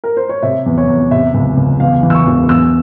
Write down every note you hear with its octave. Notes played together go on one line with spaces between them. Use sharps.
A#4
C5
C#5
C3 E5
E2
C#5
E2
C3 E5
C#2
C#2
E2 F5
E3
E6
C#6
E1
E2 E6